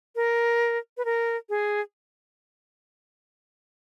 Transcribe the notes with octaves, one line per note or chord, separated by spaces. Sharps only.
A#4
B4
A#4
G#4